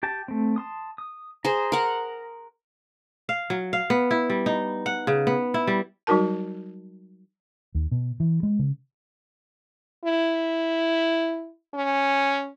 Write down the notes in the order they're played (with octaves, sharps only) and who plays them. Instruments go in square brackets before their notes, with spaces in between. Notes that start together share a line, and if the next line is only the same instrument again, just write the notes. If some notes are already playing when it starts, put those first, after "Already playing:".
[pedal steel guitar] G4 G5 A5
A3 C4
A5 C6 D#6
D#6
[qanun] G#4 C5 [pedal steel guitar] A#5
[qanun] A#4 F#5
[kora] F5
F#3
F5
B3
E4
G3
D#4
F#5
C#3
B3
E4
G3
[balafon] F#3 G3 D#4 F#4 A#4 A5
[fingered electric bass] D#2
B2
E3
G#3
C#3
[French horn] E4
C#4